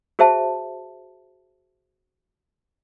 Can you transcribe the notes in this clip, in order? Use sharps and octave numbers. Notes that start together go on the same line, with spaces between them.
F#4 G#4 C5 E5 A5